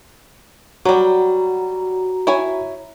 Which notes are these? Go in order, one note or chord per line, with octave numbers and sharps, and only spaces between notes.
F#3 G3 F#4 A#5
E4 C#5 G#5